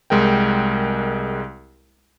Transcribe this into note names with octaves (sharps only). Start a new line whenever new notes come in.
C2 G#3 A#4 G5